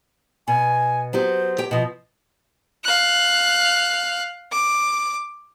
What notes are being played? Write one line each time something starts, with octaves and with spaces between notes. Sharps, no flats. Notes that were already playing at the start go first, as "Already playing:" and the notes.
B2 G#5
F#3 B3 G4 C5
G4 G5
B2 F3 D#5
F5 F#6
D6